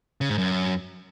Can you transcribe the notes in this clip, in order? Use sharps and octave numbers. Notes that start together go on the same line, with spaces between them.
C#3
G#2
F#2